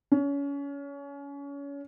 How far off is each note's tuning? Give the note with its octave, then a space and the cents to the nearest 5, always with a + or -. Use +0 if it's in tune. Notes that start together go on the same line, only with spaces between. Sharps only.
C#4 +30